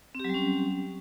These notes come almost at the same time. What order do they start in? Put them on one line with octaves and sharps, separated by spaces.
C4 G4 F#3 G3 C#4